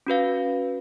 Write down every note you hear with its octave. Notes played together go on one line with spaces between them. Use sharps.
C#4 F#4 B4 F5